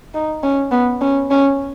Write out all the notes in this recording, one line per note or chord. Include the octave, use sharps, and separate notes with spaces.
D#4
C#4
B3
C#4
C#4